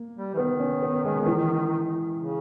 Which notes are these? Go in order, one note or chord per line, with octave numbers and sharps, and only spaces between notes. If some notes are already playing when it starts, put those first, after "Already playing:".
Already playing: A#3
G3
E3
D#3 B3
C#4
B3
G#3
E3
C#3